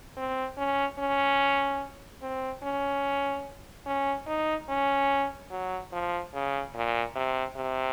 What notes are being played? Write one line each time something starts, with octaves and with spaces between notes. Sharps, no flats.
C4
C#4
C#4
C4
C#4
C#4
D#4
C#4
F#3
F3
C#3
A#2
C3
C3